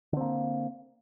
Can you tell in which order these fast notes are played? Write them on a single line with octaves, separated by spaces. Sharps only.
D3 C4 A#3